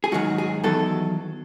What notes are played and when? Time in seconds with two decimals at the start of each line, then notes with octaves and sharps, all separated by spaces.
0.04 G#4
0.12 G#2 D#3 F#3 F#4
0.38 G#4
0.64 E2 D#3 F#3 A4